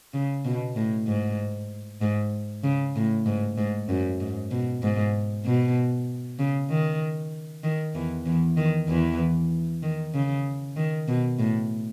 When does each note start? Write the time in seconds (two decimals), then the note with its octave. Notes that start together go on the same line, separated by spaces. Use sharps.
0.14 C#3
0.45 B2
0.76 A2
1.07 G#2
2.01 G#2
2.64 C#3
2.95 A2
3.26 G#2
3.57 G#2
3.89 F#2
4.20 G#2
4.51 B2
4.83 G#2
5.45 B2
6.39 C#3
6.70 D#3
7.64 D#3
7.95 E2 E3
8.26 E2 E3
8.57 D#3
8.89 E2 E3
9.83 D#3
10.14 C#3
10.76 D#3
11.08 B2
11.39 A2